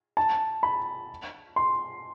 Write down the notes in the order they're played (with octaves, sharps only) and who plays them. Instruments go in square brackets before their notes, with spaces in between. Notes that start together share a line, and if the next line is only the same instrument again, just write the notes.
[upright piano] A5
B5
C6